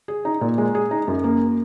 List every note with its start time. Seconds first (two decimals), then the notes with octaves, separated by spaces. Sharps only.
0.08 G#4
0.25 D#4
0.41 A#2
0.58 G#3
0.75 G#4
0.91 D#4
1.08 F#2
1.24 A#3